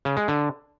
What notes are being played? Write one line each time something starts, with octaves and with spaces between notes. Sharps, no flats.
C#3
G#3
D3